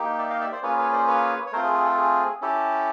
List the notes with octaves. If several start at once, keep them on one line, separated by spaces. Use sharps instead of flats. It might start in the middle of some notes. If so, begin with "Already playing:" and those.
Already playing: A#3 D#4 G4
D5 E5
D#5 F5
D5 E5
C5 D5
A#3 C#4 F4 G#4 B4 C#5
B4 C#5
C5 D5
B4 C#5
C#5
A3 C4 F4 A#4 C5
G#4
G#4
A4
G#4
C#4 E4 G4 A4